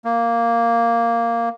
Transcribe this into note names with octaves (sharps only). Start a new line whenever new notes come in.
A#3